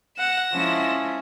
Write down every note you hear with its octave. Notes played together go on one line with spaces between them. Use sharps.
F#5 A#6 E7
F3 G#3 C#4 E4